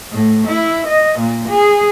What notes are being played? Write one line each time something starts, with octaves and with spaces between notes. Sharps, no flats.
A2
E4
D#5
A#2
G#4